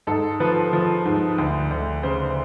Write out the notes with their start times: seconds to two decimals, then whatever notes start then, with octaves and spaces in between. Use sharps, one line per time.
0.07 G#2 A4
0.40 F3 B4
0.73 F3
1.05 G#2
1.38 D2
1.70 D2
2.03 C#3 C5